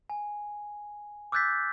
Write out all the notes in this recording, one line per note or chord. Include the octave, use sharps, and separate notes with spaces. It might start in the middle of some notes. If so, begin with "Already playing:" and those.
G#5
D6 E6 F#6 G6 A6 B6